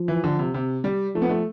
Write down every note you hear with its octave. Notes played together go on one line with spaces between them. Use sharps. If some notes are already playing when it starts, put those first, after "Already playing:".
Already playing: F3
E3
D3
C3
C3
G3
F3 A3
B3
A3